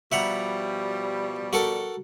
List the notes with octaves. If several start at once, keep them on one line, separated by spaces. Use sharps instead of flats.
B2 F3 G3 E5 F#5 A#5
F#4 A4 A#4